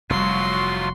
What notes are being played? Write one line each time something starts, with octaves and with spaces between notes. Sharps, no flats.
F1 F#3 G3 F4 F#4 C6